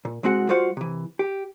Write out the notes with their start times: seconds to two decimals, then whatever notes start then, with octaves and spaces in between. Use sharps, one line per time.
0.05 A#2
0.23 C2 G#3 C4 F#4 F#5
0.49 G3 F4 F#4 C5 F5 F#5
0.77 C3 E3
1.19 G4